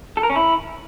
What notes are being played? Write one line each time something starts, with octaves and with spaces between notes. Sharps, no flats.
A4
A#4
C#4
E4